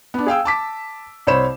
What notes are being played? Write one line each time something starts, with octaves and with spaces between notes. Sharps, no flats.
B3 D4
G#4 F5 G5 E6
A5 D6 B6
C2 C5 C#5 B5 E7